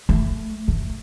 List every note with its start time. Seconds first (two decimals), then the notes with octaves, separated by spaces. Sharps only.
0.09 A3
0.68 A3